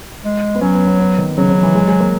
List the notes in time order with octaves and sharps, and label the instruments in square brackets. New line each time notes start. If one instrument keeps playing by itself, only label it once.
[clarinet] G#3
[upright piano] B3
[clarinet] F#3 [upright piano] C#4
[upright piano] B3
B3
B3
D#3
[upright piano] C#3 [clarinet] F#3
[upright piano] C#3
E3
G#3
G#3
A#3